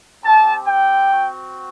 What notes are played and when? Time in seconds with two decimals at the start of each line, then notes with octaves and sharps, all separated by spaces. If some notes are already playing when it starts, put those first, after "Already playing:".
0.23 C4 G4 A5
0.66 G5
1.10 C4 F#4